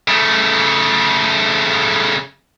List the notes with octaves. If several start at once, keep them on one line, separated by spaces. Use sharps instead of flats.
C#3 A3